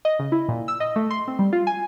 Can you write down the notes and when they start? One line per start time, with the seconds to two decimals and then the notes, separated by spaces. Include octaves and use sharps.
0.05 D#5
0.19 C#3
0.32 E4
0.48 A#2
0.68 E6
0.80 D#5
0.96 A3
1.11 C6
1.28 C4
1.39 G3
1.53 F4
1.67 G#5